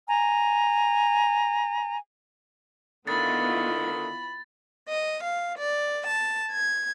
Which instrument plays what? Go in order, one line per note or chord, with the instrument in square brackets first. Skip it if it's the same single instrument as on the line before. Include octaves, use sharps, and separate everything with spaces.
[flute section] G#5 A#5
[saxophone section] D3 D#3 [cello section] B3 E4 F4 [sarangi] B5 [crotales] A6
[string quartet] D#5
F5
D5
A5
G#6